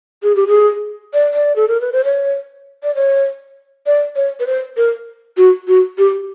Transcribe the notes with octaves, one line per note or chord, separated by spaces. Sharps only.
G#4
G4
G#4
D5
D5
A4
A#4
B4
C5
C#5
D5
C#5
D5
C#5
B4
C5
A#4
F#4
F#4
G4